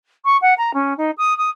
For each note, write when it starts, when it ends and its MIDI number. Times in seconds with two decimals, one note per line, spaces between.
0.24 0.37 85
0.41 0.54 78
0.57 0.73 82
0.73 0.96 61
0.97 1.10 63
1.17 1.36 87
1.37 1.49 87